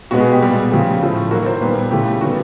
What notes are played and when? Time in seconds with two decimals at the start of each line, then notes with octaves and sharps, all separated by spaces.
0.11 B2 G#3 B3 F#4
0.21 G#4
0.32 G4
0.41 A#2 G3 B3
0.71 C#3 F3 A3 G4
1.02 A2 F3 A3
1.31 D#3 F#3 A#3 F#4
1.46 C5
1.61 A#2 G3 B3 B4
1.91 C#3 E3 A3 G4
2.21 D#3 G3 B3 F#4